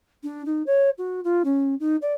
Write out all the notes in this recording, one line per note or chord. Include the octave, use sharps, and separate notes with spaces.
D4
D#4
C#5
F#4
F4
C#4
D#4
D5